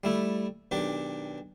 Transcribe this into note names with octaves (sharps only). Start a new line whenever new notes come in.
G3 A3 E4
B1 D#3 D4 G4